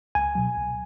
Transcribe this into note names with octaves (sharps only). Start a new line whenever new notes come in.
C#2 G#5
B2 F#3
C#2